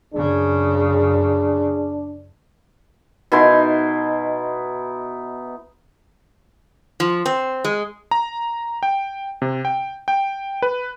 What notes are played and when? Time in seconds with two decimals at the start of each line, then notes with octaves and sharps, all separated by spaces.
0.14 F#2 C#3 D4 G#4
3.32 B2 D#4 E4 C6
7.00 F3
7.26 C4
7.65 G#3
8.11 A#5
8.83 G5
9.42 C3
9.65 G5
10.08 G5
10.62 B4